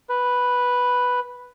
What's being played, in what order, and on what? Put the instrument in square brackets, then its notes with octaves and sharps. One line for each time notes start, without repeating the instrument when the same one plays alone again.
[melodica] B4